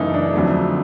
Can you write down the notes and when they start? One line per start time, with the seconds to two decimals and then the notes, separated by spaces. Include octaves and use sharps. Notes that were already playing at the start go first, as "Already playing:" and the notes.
Already playing: F#2 C#3 E3 A3 D#4 E4
0.14 D4
0.34 F2 D3 F#3 A3